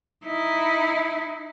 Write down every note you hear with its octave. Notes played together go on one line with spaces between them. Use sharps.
D#4 E4